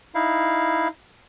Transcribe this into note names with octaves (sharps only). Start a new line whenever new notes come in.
D#4 E4 F5